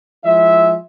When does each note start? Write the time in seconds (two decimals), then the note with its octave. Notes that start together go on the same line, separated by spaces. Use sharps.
0.25 F3 G#3 E4 E5